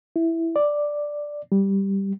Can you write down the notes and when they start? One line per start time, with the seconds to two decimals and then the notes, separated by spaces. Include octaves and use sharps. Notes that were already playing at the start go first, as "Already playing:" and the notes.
0.16 E4
0.56 D5
1.52 G3